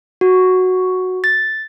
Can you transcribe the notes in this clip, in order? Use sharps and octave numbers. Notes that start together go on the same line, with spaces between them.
F#4
A6